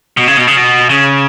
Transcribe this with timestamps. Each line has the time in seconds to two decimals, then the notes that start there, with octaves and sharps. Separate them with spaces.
0.17 B2
0.27 C#3
0.37 B2
0.47 C#3
0.57 B2
0.89 C#3